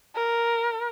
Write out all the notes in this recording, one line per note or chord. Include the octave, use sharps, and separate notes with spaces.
A#4